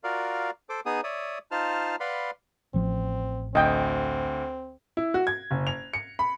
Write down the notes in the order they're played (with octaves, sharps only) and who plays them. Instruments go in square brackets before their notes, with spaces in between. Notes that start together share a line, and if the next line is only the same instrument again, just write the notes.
[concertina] F4 F#4 A#4 D5 F5
A4 C5 D6
B3 D#4 G#4 D#6
C#5 D5 E5 D#6
D#4 F4 C5 A5 F6
B4 D5 F5 F#5 B5 C6
[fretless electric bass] A1 F3 [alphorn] C4
[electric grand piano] D2 [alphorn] C4 [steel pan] D#5 G5
[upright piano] E4
F#4
G#6
F#1
F7
C#7
B5